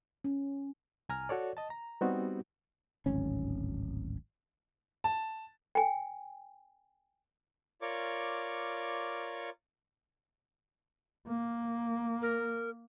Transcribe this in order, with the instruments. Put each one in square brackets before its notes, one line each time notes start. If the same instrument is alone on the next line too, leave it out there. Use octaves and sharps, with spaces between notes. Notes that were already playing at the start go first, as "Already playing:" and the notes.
[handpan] C#4
[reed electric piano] C2 G#5 A#5 F6
F#4 A4 C#5 D5
D#5 A5
A#5
G3 B3 C4 D#4 F#4 G4
[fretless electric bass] D1 G#1 C#4
[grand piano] A5
[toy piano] G5 G#5
[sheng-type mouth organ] F4 A#4 C#5 D5 C#6 D6
[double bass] A#3
[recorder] A#4